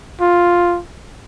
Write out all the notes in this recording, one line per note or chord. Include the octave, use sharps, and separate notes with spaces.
F4